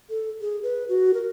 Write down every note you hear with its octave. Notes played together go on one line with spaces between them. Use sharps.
A4
G#4
B4
F#4
A#4